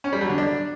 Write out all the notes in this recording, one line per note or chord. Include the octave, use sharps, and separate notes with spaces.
C#4
G3
F#3
D3
D4